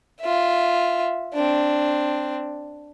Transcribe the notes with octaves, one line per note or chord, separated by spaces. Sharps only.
F4 E5
C4 D4